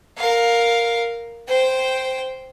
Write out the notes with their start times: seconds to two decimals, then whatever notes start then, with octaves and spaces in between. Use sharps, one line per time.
0.18 A#4 F5
1.47 C5 G5